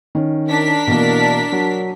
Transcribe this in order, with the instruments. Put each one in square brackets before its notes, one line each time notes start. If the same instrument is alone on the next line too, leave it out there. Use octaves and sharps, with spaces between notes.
[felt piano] D#3 C#4
[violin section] D4 A#4 B6
[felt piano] B2 E3 A#3
F#3